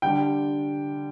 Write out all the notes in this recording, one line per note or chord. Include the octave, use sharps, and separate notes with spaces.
D3 G3 D4 G5